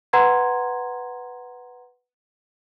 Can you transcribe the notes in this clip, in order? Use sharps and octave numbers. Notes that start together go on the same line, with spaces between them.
B4 F#5 A#5 C6 G#6